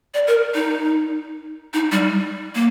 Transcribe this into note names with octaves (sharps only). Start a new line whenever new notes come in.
D5
A#4
D#4
D#4
G3
A#3